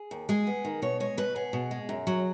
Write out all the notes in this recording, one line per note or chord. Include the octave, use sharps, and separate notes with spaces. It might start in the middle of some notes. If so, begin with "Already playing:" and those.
Already playing: G#4
D#2
G#3 G#4
B3
D#3
B2 C#5
G#3 C#5
B2 B4
B3 G#4
B2
G#3
F#2
F#3